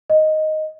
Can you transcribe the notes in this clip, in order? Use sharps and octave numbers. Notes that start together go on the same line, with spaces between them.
D#5